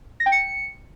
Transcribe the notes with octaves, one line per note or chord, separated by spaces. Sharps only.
A#6
G5
C#7